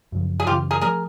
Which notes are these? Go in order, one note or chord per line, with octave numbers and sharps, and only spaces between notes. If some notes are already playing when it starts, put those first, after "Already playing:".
F#2 C#3 F3
G#4
F#2 C#3 E3 F4 G4
G#4 A#4
F3 A3 G#4 A#4